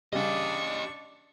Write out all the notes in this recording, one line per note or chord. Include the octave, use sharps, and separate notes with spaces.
C#3 G3 D4 G4 D#5 C#6